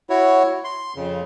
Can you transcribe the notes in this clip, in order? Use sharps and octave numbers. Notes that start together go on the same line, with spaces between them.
E4 F#4 C#5
C6
F2 C#3